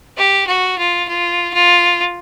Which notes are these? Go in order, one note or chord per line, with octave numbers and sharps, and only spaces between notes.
G4
F#4
F4
F4
F4